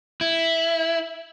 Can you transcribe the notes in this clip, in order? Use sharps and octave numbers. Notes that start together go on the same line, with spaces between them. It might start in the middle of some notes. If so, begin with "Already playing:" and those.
E4